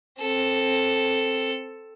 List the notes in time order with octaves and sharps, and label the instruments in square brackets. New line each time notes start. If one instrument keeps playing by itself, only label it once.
[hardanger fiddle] C4 A4